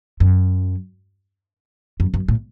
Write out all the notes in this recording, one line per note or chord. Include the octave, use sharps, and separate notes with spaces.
F#2
F#2
F#2
A2